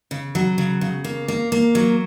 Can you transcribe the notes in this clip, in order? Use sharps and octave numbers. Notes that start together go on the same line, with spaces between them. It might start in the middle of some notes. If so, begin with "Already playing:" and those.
C#3
F#3
C#3
C#3
A#3
A#3
A#3
F#3